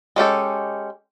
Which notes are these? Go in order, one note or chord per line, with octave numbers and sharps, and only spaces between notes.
G#3 C#4 G4 A4